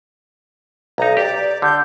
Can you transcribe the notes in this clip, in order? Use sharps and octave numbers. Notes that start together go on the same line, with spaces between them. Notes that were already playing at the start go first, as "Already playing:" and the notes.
B1 D#4 A#5
G4 D5
D3 G6